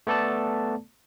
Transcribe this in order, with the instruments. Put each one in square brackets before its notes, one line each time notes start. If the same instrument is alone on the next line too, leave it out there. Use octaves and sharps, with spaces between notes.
[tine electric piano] A3 B3 A4 D5 A5